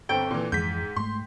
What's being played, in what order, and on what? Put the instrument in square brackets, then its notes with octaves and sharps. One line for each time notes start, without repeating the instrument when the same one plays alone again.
[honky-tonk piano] G1 C4 [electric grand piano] A4 [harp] G5
[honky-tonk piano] A#2 E3
[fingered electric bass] F2 E3 [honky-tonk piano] G#2 [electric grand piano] G6 B6
[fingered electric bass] G#2 A3 [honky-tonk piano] C6